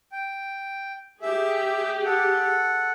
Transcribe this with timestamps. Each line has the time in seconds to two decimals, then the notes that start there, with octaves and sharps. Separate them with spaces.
0.12 G5
1.22 G4 G#4 E5
2.05 A4 F#5